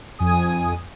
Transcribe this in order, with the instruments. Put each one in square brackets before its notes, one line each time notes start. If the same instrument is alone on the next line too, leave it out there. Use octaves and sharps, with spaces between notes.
[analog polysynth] F2 G#5 D#6